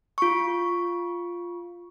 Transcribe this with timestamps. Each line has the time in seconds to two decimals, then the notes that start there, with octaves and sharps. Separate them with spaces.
0.18 F4 C#6